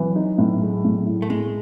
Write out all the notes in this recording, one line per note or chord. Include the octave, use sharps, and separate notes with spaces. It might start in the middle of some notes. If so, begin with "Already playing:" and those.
Already playing: E3 F#3
D#4
A2
G#3
A2
E4
A3
A2 G#3